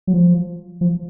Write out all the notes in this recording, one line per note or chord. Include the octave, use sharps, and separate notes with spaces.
F#3
F3
F3